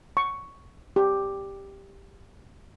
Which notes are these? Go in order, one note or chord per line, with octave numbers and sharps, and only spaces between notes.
C#6
G4